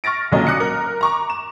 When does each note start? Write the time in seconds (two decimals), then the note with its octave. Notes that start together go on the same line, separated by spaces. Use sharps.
0.04 C#6 F6 A6 A#6 D7
0.32 B1 A#2 D3 F#3 C#4 D#5
0.47 D6 D#6 F#6 A#6 C#7
0.60 A#4
1.01 A#5 C#6 D6
1.30 E7